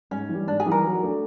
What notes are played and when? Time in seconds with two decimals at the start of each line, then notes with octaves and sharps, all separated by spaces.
0.11 G#2 C#4
0.29 E3
0.34 G3
0.47 G#2 D4
0.60 G#4
0.66 E3 G3
0.71 A#4
0.84 F#3
1.02 A3 D4